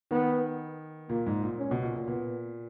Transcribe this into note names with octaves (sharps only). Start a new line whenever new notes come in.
D#3 B3
A#2 A#3
G#2
A#2
C#4
B2
A#2
A#2
A#2 B3